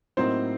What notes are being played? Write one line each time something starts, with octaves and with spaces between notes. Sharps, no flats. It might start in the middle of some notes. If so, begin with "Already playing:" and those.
A2 F#3 A#3 C4 D#4 C5